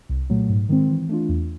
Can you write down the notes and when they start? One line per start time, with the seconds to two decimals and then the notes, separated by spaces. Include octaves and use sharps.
0.09 C2
0.30 A#2 F#3 A3
0.49 G#2
0.69 D#3 G#3 C4
0.89 E3
1.09 A3 D4 F4
1.29 E2